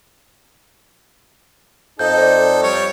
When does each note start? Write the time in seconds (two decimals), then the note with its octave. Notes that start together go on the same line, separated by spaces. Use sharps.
1.99 F2 D#4 A4 D#5 G6
2.18 C5 D5
2.63 G3 C#5